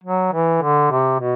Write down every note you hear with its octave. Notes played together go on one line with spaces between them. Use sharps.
F#3
E3
D3
C3
B2